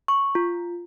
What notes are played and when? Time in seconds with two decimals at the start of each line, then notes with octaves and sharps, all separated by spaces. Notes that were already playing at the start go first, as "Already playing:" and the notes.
0.08 C#6
0.35 F4